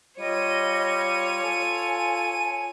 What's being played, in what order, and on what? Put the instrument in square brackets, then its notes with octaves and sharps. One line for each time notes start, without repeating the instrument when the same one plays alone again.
[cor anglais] G3 [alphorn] F4 [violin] C#5 D#7 [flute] D#5
[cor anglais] A4 [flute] G#5